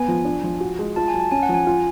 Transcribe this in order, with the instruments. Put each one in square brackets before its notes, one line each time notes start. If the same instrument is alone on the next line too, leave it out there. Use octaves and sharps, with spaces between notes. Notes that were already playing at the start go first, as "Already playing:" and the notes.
Already playing: [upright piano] B3 [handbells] G#5
[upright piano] F3
D4
F3
F#4
G#3
[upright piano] F4 [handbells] A5
[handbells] G#5
[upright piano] F#3
[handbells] A5
[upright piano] C#4 [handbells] G#5
[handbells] F#5
[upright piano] F3
[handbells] G#5
[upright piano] F4